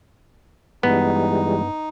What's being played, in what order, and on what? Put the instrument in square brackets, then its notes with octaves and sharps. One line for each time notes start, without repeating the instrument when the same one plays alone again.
[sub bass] G2 [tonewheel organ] E3 G3 G#3 [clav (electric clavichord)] B3 [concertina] D#4